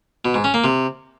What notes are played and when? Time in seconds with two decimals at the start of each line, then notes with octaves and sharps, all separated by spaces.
0.25 B2
0.34 G#2
0.44 C#4
0.54 A#3
0.64 C3